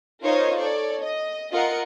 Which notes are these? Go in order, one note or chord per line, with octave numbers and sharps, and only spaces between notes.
D#4 F4 A#4 C5 C#5 D#5
A4 C#5 D5
D#5
F4 A#4 D#5 F#5 C#7